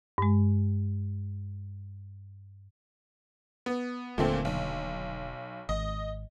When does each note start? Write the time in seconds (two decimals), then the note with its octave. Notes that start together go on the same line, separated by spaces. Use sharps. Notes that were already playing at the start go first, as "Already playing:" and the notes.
0.18 G2 G#3
3.66 B3
4.18 D#1 D#2 A#2 D3 A3 C4
4.45 B1
5.69 G#1 D#5